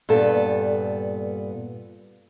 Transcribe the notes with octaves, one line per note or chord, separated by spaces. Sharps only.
G2 A#2 B3 A4